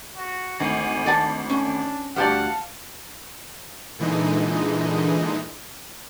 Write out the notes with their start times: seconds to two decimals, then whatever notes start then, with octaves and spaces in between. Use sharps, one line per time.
0.17 F#4
0.60 G#1 D2 G#5
1.06 D5 F#5 A5
1.50 C#4 D4
2.16 D2 G4 D5 F5 F#5 A5
3.99 A#2 D3 E3 G#3 D#4